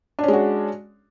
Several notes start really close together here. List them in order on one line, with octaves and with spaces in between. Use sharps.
D4 C#4 G#3 F#4